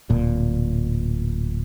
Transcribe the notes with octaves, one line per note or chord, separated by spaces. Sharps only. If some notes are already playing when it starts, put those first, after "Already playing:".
D1 A#2